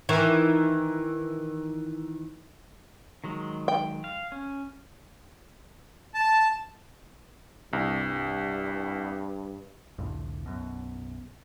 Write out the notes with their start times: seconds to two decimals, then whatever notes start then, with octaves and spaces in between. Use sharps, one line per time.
0.09 D#3 E3
3.24 D#3 F#3 G#3
3.68 G5
4.04 F5
4.32 C#4
6.14 A5
7.73 C2 G2
9.98 C2 F2 A2 D3
10.46 B1 F#2 B2